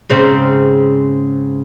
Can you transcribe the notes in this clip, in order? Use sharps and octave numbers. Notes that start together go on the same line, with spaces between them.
G#2 C#3 C4